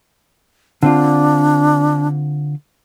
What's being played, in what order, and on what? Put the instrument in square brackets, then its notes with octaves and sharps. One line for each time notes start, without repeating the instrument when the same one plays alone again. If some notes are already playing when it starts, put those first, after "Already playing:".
[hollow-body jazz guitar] D3 C4 F4 [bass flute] D4